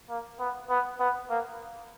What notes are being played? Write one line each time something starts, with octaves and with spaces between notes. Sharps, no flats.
A#3
B3
B3
B3
A#3